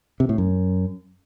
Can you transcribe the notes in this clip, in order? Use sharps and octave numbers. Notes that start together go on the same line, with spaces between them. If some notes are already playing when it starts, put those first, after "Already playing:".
C3
A2
F#2